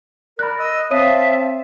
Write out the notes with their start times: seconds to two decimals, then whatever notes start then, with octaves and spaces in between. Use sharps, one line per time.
0.39 A#4 D5 B5 F#6
0.59 D#5 E6
0.91 C4 C#5 E5 F5 A5 D#6 D#7